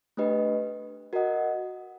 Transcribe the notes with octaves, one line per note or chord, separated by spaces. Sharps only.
A3 D4 G4 B4 D#5
F#4 A#4 D#5 F#5